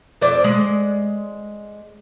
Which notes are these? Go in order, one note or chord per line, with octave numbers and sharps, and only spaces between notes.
F2 C5 D5
G#3